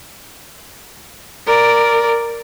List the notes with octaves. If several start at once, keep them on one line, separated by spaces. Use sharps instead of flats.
A#4 D5